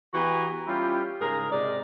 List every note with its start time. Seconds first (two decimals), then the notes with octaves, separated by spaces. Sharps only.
0.14 E3 B3 F#4 G4 G#5 A#5
0.67 G3 C#4 E4 F4 G4
1.21 G#2 C#3 G#4 A#4 A#5
1.51 G#2 C3 D#4 D5 D#5 A#5